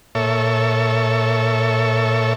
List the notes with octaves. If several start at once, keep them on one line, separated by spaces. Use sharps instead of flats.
A#2 A4 C#5 E5